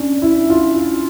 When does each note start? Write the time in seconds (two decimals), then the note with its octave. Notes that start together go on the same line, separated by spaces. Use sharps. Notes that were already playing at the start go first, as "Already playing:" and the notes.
Already playing: C#4 D4
0.22 E4
0.50 F4